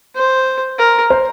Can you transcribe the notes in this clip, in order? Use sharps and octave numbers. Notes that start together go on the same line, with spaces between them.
C5
A#4
C5